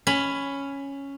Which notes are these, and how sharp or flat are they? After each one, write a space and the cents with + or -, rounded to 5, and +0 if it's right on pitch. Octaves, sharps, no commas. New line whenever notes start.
C#4 +0 B5 +10